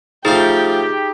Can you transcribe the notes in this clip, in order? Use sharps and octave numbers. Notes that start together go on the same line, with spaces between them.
F3 A3 D#4 G4 G#4 F5 G5